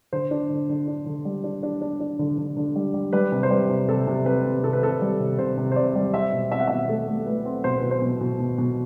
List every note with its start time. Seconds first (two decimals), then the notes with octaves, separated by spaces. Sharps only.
0.13 D3 C5
0.31 D4
0.50 D3
0.69 D3
0.88 D4
1.06 D3
1.25 G3
1.44 D4
1.63 D4
1.82 D4
2.00 D4
2.19 D3
2.38 D3
2.57 D3
2.76 G3
2.94 G3
3.13 G3 B4
3.32 C3
3.43 C5
3.50 G3 B4
3.69 C3
3.88 C3 A4
4.07 C3
4.26 C3 B4
4.45 C3
4.63 C3 A4
4.73 B4
4.82 C4 A4
5.01 G3
5.20 C3
5.39 C3 C5
5.57 C3
5.72 C5
5.76 C4 D5
5.95 G3
6.13 C4 E5
6.32 B2
6.52 C4 E5
6.60 F#5
6.67 E5
6.70 B2
6.89 A3 A4
7.08 A3
7.27 A3 B4
7.45 C4
7.64 B2 C5
7.78 B4
7.83 B2
7.91 C5
8.02 B2
8.21 B2
8.39 B2
8.58 B2